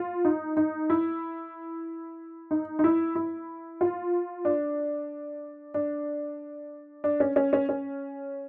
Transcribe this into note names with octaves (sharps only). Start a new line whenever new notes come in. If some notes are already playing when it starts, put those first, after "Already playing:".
Already playing: F4
D#4
D#4
E4
D#4
D#4
E4
E4
F4
D4
D4
D4
C#4
C#4
C#4
C#4